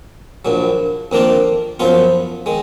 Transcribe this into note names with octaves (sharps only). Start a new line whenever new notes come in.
A#1 A#2 F#3
F2 D#3 A#3 D4 F4
F#2 F3 B3 F4
D#3 G#3